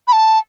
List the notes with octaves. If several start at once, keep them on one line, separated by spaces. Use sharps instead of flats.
B5
A5